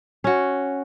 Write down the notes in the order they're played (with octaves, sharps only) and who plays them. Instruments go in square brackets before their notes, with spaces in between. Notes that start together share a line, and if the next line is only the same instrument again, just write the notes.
[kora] C#4 F#4